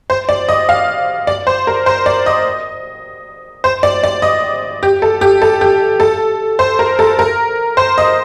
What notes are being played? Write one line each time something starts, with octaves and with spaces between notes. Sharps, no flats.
C5
D5
D#5
F5
D5
C5
A#4
C5
D5
D#5
C5
D5
D5
D#5
G4
A4
G4
A4
G4
A4
C5
A#4
A4
A#4
C5
D#5